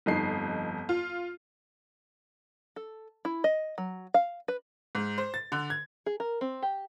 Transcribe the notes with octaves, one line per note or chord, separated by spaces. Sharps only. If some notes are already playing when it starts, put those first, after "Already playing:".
G1 F2 D#4 C7
F4
A4
E4
D#5
F#3
F5
B4
G#2
C5
A6
D3
G#6
G#4
A#4
C4
G4